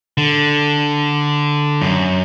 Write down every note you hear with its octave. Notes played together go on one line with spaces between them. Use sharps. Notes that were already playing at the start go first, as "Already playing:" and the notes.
D3
F#2